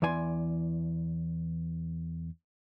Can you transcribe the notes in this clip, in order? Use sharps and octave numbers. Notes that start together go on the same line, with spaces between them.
E2 E3 D5 G#5 C6